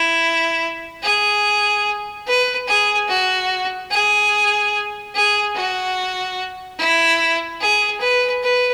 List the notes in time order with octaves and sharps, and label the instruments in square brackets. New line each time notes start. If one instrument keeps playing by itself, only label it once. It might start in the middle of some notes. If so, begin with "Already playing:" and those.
Already playing: [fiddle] E4
G#4
B4
G#4
F#4
G#4
G#4
F#4
E4
G#4
B4
B4